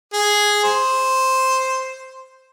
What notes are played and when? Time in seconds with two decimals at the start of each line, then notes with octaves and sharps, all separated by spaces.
0.13 G#4
0.64 C5